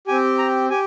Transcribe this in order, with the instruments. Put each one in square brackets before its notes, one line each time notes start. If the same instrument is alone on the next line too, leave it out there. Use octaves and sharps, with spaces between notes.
[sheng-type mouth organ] C4 G4 G#5
A#5
G4 G#5